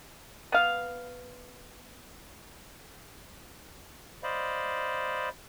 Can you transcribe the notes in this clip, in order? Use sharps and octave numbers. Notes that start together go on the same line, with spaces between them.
B3 F5
C5 D5 D#5 F5 B5